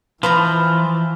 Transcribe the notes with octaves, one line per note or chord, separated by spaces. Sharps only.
E3 F3 B4 A5 A#5